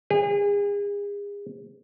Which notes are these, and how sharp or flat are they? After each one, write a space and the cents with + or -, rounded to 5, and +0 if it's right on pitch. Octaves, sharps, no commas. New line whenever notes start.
G#4 -35